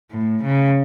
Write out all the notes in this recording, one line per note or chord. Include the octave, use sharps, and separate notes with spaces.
A2
C#3